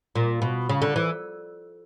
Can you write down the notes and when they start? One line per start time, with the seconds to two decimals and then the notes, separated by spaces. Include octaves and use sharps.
0.15 A#2
0.42 B2
0.69 C#3
0.82 D3
0.96 E3